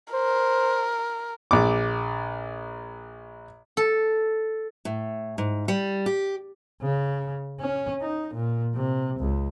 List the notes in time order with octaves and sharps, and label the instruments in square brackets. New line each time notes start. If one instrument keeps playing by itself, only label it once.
[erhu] A#4 [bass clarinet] C5
[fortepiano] A#1 D6
[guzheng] A4
[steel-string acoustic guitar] A2
G#2
G3
G4
[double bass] C#3
C#4
D#4
A#2
C3
C#2